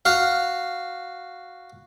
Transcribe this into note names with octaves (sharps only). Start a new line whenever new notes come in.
F#4 F5